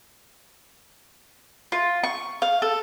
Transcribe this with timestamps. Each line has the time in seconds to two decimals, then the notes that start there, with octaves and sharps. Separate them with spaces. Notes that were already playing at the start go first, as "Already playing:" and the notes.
1.72 F4
2.04 C#6
2.42 F5
2.62 A4